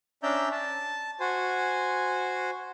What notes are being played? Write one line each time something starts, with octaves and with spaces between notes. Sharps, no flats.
C#4 D4 D5 E5 A#5 G6
A5
F#4 C5 G#5